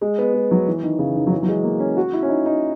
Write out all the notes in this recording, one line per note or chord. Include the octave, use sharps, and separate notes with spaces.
G#3
B3
G#3
F#3
E3
D#3
C#3
D#3
F#3
E3
F#3
G#3
A#3
C#4
F#4
E4
C#4
D#4
D#4